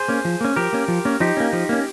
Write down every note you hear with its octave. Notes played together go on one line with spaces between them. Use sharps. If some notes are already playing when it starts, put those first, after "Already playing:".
Already playing: G#4 C5
A#3 C#4
F3
A#3 C#4
F3 G4 A#4
A#3 C#4
F3
A#3 C#4
F3 D#4 G4
A#3 C#4
F3
A#3 C#4